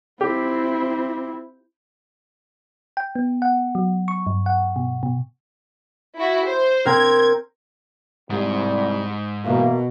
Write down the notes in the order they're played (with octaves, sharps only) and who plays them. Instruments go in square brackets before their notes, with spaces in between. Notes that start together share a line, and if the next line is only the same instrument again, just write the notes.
[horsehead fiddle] C4 E4 [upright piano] G4
[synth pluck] G5
B3
F#5
F#3
C#6
G2
F#5
B2
B2
[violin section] E4 F#4
C5
[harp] C4 A#4 [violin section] G#6
[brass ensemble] C2 G3 [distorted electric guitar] G#2
[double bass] B2 [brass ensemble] E3 A#3